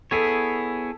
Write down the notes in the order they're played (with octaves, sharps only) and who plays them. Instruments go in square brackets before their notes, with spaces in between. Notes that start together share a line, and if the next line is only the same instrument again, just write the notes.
[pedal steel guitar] B3 E4 G#4 C#5 [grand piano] A4